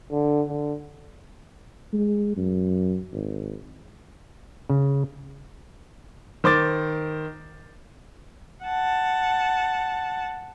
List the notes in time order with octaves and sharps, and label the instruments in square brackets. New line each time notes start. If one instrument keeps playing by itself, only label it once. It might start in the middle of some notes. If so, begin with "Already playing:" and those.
[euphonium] D3
D3
[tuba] G#3
F#2
G#1
[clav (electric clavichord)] C#3
[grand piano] D#3 C5 D6 A6
[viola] F#5 A5